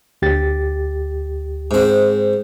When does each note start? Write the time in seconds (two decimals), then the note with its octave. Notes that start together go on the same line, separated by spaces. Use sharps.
0.22 D2 G4 A6
1.71 G#2 C4